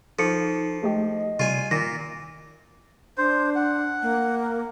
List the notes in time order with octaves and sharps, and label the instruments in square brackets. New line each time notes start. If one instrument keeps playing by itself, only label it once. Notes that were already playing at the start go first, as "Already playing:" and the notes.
[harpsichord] F3 [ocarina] D#4 [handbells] A4 C#7
[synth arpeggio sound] G#3 A3 G4 [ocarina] D#5
[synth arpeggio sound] C3 G3 [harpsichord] F4 G#5
[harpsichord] A#2 [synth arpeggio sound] D#3 [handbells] A#6
[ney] D4 [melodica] C5
[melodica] F#5
[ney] A#3